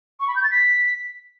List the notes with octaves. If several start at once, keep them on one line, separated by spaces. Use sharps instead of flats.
C#6
B5
G6
A6
B6